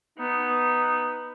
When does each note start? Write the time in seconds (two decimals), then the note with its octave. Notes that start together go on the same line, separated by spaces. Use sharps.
0.19 B3 D#4